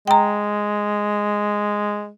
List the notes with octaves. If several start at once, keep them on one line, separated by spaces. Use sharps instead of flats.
G#3 G5 A#5